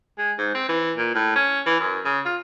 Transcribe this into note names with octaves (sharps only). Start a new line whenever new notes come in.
G#3
G#2
C4
E3
A#2
A2
C#4
E3
F#2
C#3
F4